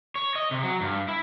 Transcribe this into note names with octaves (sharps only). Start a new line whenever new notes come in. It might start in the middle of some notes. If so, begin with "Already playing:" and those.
C#5
D#5
C3
F#3
G2
E4